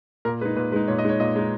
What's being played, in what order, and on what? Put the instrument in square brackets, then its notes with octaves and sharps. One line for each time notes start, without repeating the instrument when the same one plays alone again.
[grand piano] A#2 A#4
G#3 D#4 B4
A#2 B4
G#3 D#4 B4
A#2 C#5
D#5
G#3 D#4 C#5
A#2 D#5
G#3 D#4